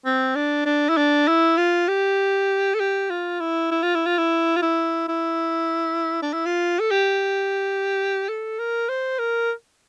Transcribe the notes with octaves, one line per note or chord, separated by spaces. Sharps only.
C4
D4
D4
E4
D4
E4
F4
G4
A4
G4
F4
E4
E4
F4
E4
F4
E4
F4
E4
E4
D4
E4
F4
A4
G4
A4
A#4
C5
A#4